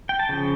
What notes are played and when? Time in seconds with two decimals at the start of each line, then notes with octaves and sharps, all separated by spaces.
0.09 G5
0.20 A5
0.29 C#3 F3